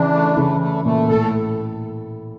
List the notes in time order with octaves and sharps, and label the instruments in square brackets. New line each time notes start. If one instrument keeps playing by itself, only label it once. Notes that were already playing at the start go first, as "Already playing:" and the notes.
Already playing: [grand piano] C#3 E3 [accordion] D4
[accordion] A3
[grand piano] C#3 E3 [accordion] A3
[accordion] A3
[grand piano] A#2 [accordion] A3
[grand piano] A2 [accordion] A4